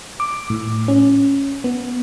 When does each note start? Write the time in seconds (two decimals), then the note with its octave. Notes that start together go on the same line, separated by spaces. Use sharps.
0.20 D6
0.50 A2
0.88 C#4
1.64 B3